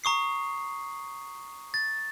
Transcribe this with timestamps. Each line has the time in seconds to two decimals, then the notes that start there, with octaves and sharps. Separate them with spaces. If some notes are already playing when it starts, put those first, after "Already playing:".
0.04 A#5 C#6 D#6 C7
1.74 A6